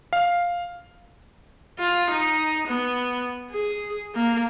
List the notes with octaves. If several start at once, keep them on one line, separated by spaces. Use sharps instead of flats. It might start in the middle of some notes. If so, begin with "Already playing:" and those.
F5
F4
D#4
B3
G#4
A#3